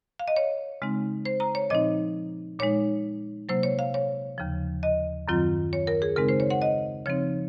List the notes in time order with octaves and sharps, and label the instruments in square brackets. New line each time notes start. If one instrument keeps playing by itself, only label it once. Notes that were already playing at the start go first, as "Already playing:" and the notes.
[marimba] F5
D#5
C#5
C#3 G#3 C4 D#4
C5
A#5
C#5
A#2 F3 C4 D#4 D#5
A#2 G#3 D#4 C#5
C3 F#3 A#3 C5
C#5
F5
C#5
D#2 C#3 F3
D#5
F#2 D#3 F#3 C4 F4
C#5
A#4
G#4
C#3 G#3 C4 D#4 A#4
C5
C#5
F#5
D#5
C#3 F3 C4 D#4 C#5